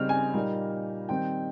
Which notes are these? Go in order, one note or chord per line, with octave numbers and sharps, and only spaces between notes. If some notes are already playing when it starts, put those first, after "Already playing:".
Already playing: C#3 G3 C4 D#4 F6
G#5
A#2 G3 A#3 D#4
D#3 G3 C4 D#4 G5